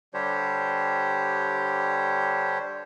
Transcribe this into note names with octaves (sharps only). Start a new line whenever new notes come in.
D3 G3 D4 G4 C5 C#5